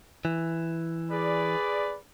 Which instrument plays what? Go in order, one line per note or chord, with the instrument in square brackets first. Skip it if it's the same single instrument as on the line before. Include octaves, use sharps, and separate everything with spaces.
[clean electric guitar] E3
[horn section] G#4 B4 D5